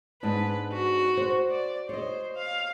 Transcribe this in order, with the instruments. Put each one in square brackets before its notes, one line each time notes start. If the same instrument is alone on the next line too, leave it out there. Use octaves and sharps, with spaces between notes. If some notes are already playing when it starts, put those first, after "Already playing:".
[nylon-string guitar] G#2 B3 D4 [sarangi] B4
[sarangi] F#4
[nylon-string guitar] C5
[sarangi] D5
[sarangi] C5 [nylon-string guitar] C#5 D#5
[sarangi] F5